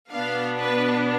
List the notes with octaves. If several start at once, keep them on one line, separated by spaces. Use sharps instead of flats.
B2 B3 D4 F5
B4